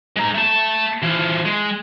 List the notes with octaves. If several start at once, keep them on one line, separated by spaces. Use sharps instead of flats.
G#3 A#5
A3 A5
E3 F3
G#3